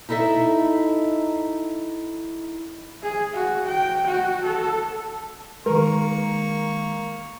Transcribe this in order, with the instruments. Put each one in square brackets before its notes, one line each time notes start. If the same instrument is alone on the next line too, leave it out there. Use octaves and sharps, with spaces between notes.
[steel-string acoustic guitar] D#4 E4 A4 D#5 E5
[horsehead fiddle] G#4
F#4
G5
F#4
A4
[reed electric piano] D#3 G#3 [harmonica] A#3 C#6 [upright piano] A#4